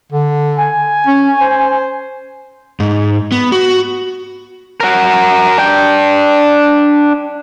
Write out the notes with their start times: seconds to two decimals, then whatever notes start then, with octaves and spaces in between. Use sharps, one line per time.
0.12 D3
0.59 G#5
1.07 C#4
1.41 C5
2.80 G#2
3.32 B3
3.52 F#4
4.80 F#4 A#4
5.58 D4 G5